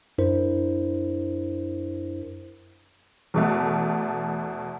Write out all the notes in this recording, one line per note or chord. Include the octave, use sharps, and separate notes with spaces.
F#2 D4 E4 A#4 C5
E2 B2 A3